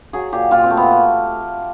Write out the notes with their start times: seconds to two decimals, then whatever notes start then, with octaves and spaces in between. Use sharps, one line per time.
0.13 F#3 G#4
0.33 A#2 G4
0.51 A#2 F4
0.64 C4
0.70 A3
0.77 B3